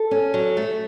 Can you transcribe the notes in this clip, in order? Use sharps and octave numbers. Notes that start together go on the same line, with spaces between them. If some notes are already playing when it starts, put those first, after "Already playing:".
Already playing: A4
C#4
F#3
A3